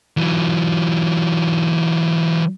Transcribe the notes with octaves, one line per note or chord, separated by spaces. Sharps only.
E3 F#3